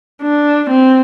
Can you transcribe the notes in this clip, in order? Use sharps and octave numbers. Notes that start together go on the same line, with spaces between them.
D4
C4